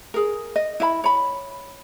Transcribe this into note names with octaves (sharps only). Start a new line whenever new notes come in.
G#4 A#4
D#5
E4 E5 B5
C#5 B5